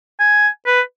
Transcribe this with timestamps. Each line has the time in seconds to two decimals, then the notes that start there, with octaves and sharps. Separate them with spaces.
0.20 G#5
0.67 B4